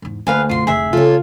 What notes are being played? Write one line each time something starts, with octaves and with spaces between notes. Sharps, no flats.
E2 G#2
D2 A#3 B4 F5 G#5
B1 F#2 F4 C6
F1 C2 G#4 E5
C#3 C#4 F4 A4 C#5